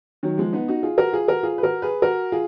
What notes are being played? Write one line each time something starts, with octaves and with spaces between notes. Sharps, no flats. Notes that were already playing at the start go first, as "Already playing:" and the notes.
D#3 F#3
F3 G#3
B3 D#4
D#4 F#4
F4 G#4
F#4 A#4
F4 G#4
F#4 A#4
F4 G#4
B4
F#4 A#4
G#4 B4
F#4 A#4
F4 G#4